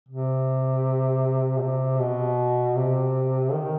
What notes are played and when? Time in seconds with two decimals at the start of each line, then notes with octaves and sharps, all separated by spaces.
0.09 C3
1.57 B2
1.62 C3
1.99 B2
2.76 C3
3.53 D#3